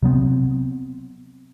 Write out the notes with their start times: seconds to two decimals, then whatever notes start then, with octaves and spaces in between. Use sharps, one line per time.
0.03 C3 F#3 B3 C4